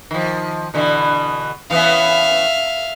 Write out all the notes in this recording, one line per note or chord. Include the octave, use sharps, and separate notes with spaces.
D#3 F3
B2 D3 E3
E3 B3 C#4 E5 F5